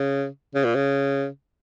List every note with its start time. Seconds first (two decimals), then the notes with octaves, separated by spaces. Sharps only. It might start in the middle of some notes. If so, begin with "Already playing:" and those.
Already playing: C#3
0.55 C#3
0.64 A#2
0.75 C#3